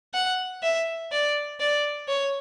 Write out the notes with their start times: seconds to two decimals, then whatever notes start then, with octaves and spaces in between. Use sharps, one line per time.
0.14 F#5
0.63 E5
1.12 D5
1.60 D5
2.09 C#5